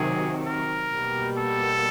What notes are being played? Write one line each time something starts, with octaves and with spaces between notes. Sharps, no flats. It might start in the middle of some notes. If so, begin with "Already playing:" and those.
Already playing: C3 D#3 F#3 G#4
A#4
B2 G3 A#3
A4